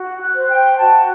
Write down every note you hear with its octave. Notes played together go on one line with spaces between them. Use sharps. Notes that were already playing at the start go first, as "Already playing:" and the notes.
Already playing: F#4
F#6
C5
G5
F#4 A5